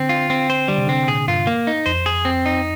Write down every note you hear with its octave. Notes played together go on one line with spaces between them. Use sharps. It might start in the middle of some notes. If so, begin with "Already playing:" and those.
Already playing: D3 C4
F4
C4
C5
D3 G3
C3
D3
C4
A#2 G#4
G2 F4
A#3
D#4
F2 C5
G#4
C4
D#4